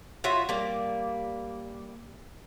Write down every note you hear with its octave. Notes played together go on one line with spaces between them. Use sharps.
F4 F#4 C#5 E5
G3 A#3 D5